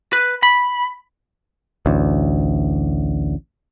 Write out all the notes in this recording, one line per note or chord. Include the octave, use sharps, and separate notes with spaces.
B4
B5
A1 D2